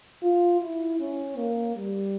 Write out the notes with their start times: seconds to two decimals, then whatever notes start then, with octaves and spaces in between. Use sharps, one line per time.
0.22 F4
0.60 E4
0.99 C#4
1.37 A#3
1.76 G3